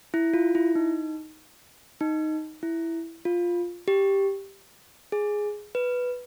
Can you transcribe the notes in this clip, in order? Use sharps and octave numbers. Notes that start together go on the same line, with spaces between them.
E4
F4
E4
D#4
D#4
E4
F4
G4
G#4
B4